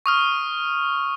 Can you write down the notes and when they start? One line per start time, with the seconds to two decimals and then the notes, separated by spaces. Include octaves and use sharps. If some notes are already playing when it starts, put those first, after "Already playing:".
0.06 C#6 D#6 F6